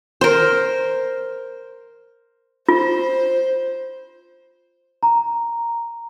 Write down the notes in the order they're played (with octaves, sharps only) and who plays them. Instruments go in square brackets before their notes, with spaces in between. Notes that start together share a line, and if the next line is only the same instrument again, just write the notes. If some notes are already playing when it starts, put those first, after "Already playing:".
[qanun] A#4 C5
[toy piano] F4 [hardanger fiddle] C5
[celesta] A#5